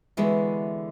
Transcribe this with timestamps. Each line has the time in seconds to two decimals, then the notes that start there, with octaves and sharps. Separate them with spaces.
0.17 D3 E3 G#3 B3 E4 F#4